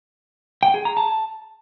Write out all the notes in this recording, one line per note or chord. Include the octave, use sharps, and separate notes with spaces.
G5
G#4
A#5
A5